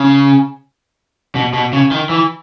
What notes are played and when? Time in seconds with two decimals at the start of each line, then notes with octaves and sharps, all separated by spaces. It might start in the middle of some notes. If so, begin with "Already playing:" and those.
Already playing: C#3
1.35 B2
1.54 B2
1.73 C#3
1.91 D#3
2.09 E3